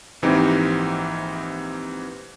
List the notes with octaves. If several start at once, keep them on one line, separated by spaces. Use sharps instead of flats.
A#1 G#2 E3 C4 D#4 G4